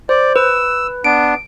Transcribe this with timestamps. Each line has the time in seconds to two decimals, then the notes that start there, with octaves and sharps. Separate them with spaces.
0.09 C5 D5
0.36 B4 E6
1.04 B3 D4 D7